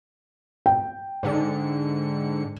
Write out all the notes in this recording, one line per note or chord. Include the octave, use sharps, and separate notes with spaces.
G5
G#2 D3 C#7